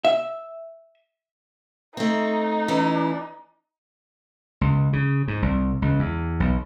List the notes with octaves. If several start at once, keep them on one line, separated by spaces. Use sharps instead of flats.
E5
A3 C4 D#4
E3 C#4 E4
C#2
C#3
G#2
C2
C#2
E2
B1